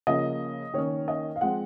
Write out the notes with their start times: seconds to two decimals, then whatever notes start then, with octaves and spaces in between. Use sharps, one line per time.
0.07 C#3 F3 A#3 C#4 D#5
0.74 D#3 A#3 C#4 C#5
1.08 D#5
1.36 F5
1.41 F3 G#3 C4 F#5